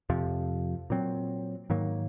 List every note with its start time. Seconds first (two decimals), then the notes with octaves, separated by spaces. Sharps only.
0.09 F2 C3 F3
0.90 A#2 F#3 C4
1.70 G#2 D#3 F#3 A#3